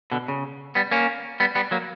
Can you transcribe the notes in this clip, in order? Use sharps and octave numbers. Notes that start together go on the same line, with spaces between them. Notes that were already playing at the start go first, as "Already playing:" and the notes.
B2 D3
C#3
G3 B3
A#3 C#4
G3 B3
G3 B3
F#3 A#3